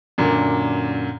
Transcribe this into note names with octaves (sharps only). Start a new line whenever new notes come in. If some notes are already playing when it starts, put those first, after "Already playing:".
F#2 A#2 D3